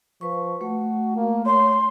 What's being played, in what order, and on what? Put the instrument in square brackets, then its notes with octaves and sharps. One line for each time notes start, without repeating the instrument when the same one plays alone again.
[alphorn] F3 [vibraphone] B4 C#6
[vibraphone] A3 [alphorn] F#4
[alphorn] A#3
[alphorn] C#5 [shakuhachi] C6